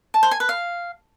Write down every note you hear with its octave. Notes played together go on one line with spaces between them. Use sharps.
A5
C5
G#5
B4
F5